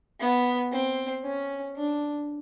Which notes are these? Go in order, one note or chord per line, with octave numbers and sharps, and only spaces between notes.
B3
C4
C#4
D4